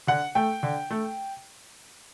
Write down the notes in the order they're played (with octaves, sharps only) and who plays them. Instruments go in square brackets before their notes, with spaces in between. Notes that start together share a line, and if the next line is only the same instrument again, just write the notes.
[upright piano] D3 F#5
A3 G5
D3
A3